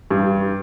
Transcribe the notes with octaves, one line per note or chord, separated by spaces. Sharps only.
G2